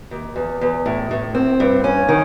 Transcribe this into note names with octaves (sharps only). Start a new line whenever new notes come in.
D#2
E2
E2
A2
A2
C4
G2
C#4
D#3